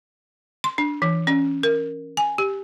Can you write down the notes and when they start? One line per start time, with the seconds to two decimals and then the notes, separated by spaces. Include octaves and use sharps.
0.64 C6
0.78 D4
1.02 E3
1.27 C#4
1.63 A#4
2.17 G#5
2.38 G4